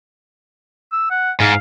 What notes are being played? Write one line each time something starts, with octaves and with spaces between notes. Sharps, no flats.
E6
F#5
G#2 F5